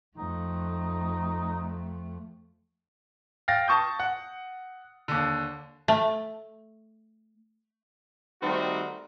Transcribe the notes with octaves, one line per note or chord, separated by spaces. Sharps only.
F2 A3 D#4
F5 G5 A6 A#6
A5 C#6 D#6 G6
F#5
D#2 D3
A3
D#3 G3 A3 C4 D#4 F#4